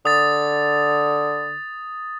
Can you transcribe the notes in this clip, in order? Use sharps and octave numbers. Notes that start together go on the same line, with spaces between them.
D3 D#6 A6